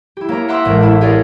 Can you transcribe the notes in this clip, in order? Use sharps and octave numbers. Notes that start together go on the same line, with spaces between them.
E4 G4
A#3 C#5 A#5
E5 F#5 A#5 C6 D6 E6
A1 A2 G#3 A#4
D4 E4
G4 G#4 A#4 C#5 D5